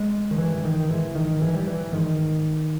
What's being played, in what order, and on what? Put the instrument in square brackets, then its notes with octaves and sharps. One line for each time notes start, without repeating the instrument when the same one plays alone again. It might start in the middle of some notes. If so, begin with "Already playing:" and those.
Already playing: [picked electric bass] G#3
D#3
G2 E3
D#3
G#2 E3
D#3
G#2 E3
G3
E3
G#2 D#3